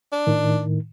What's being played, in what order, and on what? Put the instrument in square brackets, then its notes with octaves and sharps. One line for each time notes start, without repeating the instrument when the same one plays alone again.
[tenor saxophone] D4
[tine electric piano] A2 D#3